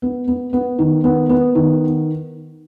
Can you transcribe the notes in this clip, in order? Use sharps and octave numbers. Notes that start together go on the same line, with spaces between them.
B3
B3
B3
D#3
B3
B3
D#3